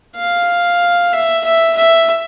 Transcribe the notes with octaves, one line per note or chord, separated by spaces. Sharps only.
F5
E5
E5
E5